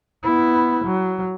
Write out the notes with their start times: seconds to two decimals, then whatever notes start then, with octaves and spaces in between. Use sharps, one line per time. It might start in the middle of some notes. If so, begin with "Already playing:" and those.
0.23 B3 E4
0.85 F#3